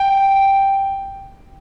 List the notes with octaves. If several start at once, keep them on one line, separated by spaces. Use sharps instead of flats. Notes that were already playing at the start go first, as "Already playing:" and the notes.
Already playing: G5